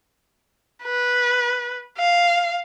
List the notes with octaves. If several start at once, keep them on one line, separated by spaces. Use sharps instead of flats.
B4
F5